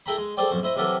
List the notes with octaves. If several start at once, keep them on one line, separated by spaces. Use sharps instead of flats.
E4 G#4 A4 G5 A#5 B5
G#3
G#4 A4 C5 D5 G5
B1 F2 C5 C#6
E4 C5 D#5
C3 E3 F#3 G4 A4 A#4